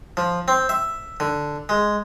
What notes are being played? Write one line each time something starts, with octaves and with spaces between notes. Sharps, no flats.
F3
C4
E5
D3
G#3